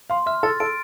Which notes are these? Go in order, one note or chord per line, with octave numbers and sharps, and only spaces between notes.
F5 C6
E5 F6
A4 A6
A4 D7